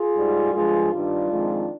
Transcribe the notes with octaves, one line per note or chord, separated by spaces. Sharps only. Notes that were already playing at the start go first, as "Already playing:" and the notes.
Already playing: F4 G#4
G#2 G3
G2 F3 G#3 F4 G#4
G2 D#3 G3 D4 F4
F2 D#3 G#3